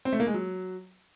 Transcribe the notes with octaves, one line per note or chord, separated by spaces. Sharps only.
C4
A3
A#3
G#3
F#3